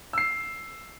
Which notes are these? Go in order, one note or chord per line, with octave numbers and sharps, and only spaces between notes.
E6 C7